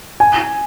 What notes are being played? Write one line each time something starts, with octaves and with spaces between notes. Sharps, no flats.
G#5